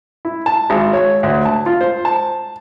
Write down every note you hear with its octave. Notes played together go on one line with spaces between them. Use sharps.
E4
A5
G#1
C#5
D2
A5
F4
C5
A5